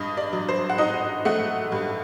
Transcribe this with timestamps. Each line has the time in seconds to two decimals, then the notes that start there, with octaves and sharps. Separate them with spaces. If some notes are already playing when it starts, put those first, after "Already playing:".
Already playing: G2 D#5
0.17 D5
0.33 F#3
0.49 C5
0.70 F#5
0.78 D#4 D#5
1.25 A3 F#5
1.72 G2